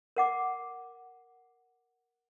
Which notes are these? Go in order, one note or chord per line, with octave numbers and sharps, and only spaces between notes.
A#4 F#5 D6